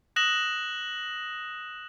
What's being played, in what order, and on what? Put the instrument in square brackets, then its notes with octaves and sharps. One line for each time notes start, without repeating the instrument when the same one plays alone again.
[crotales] D#6 F#6 A#6 E7 F#7